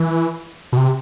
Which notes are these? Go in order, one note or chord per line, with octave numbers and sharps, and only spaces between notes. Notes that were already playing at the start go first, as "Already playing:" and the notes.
Already playing: E3
B2
C3